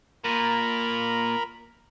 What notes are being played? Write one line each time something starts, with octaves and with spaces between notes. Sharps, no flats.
A#2 A#4 A#5 B5